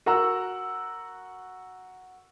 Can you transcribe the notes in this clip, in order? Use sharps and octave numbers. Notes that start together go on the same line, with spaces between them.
F#4 A#4 F#5 A#5 E6